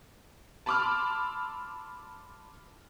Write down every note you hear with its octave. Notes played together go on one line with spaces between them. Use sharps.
A5 B5 C6 D6 E6 F6